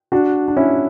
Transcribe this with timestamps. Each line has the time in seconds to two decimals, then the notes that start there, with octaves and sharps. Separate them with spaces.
0.12 D4 F#4
0.48 D4
0.57 C#4 E4